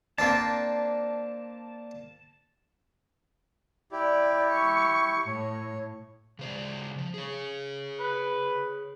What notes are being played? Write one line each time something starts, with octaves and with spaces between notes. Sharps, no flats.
A#3 C4 D4 A5
E4 G4 D5
C#6
A2 C#5
C#3 C5 D5
F3
G#4 C#5
B4